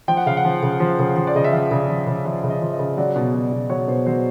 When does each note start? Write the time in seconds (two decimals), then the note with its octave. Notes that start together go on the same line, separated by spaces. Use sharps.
0.08 F3 G5
0.17 F#5
0.26 C#3 F5
0.37 F#5
0.45 F3
0.63 C#3
0.80 F3
0.99 C#3
1.16 F3
1.27 D5
1.35 C#3 D#5
1.44 E5
1.53 F3 F5
1.71 C#3
1.89 F3
2.07 C#3
2.25 F3 E5
2.44 C#3
2.50 D#5
2.62 F3
2.73 D#5
2.79 C#3
2.97 F#3 D5
3.16 B2
3.34 F#3
3.52 B2
3.70 F#3 C#5
3.88 B2 C5
4.06 F#3 C5